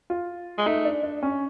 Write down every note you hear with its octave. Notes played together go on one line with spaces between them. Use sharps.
F4
G#3
A3 D#4
D4
D4
C#4